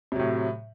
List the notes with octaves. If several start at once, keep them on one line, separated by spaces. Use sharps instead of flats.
A2 C3 F#3